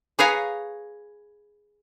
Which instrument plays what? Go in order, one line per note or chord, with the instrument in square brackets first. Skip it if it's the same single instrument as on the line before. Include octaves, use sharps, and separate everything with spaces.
[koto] G#4 B4 C#5 F5 G#5 A#5